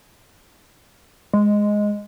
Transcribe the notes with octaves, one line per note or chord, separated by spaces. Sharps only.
G#3